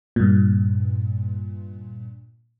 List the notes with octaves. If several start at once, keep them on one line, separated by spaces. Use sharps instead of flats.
G2 A#2